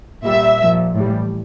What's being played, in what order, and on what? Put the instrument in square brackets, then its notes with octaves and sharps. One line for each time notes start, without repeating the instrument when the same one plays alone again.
[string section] A#2 G3 E5
A#2 F3
A2 E3 G3